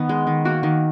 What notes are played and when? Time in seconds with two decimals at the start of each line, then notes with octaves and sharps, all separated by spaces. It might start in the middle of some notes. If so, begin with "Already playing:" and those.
Already playing: D#3 B3
0.09 G#3
0.27 D#3
0.45 A#3 F#4
0.63 D#3